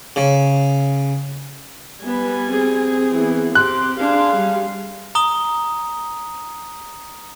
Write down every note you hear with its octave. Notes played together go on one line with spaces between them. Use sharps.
C#3
G3 B3 B4 G#5
C4 G#4
E3 B3
C4 G4 C6 F#6
D4 G#4 F5
G3
A#5 D#6 G7